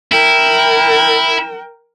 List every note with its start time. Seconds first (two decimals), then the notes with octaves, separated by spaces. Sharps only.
0.12 E4 A#4 G5